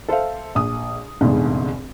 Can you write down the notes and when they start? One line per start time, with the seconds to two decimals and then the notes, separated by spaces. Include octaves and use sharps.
0.09 A4 C5 E5 F5
0.55 A#1 D#6
1.21 F1 A#1 E2 G#2 D3